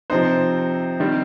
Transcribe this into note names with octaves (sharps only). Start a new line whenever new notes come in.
C3 F3 C4 D#4 C5
D#3 G3 C4